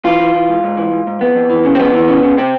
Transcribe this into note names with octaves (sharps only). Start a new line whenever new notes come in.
E3 F4
E3
E3
G#2
G#2
E3
G#2
G#2
F2 B3
F2
E3
C#3
C4
F2 B3
E3
C#3
C#3
C3 C4